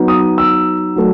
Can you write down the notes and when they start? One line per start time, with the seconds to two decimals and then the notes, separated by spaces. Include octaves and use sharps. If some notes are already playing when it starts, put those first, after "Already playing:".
Already playing: F#3 B3 D#4
0.08 D#6
0.38 E6
0.96 F#3 A3